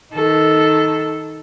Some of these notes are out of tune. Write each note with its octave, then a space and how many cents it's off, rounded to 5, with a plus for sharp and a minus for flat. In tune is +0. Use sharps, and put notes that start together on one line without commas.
D#3 +15 A4 +0